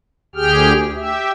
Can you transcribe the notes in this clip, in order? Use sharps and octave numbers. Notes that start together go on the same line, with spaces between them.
D2 G4 G#4 G5 F6
G4 E5